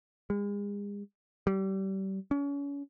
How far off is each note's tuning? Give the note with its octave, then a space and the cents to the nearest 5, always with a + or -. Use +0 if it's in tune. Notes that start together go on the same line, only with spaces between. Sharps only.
G#3 -40
G3 -30
C#4 +35